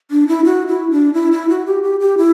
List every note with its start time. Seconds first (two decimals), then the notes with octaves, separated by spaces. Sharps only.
0.11 D4
0.28 E4
0.45 F#4
0.67 E4
0.91 D4
1.13 E4
1.32 E4
1.49 F#4
1.66 G4
1.83 G4
2.00 G4
2.18 E4